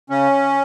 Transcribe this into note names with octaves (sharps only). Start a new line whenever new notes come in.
C#3 C#4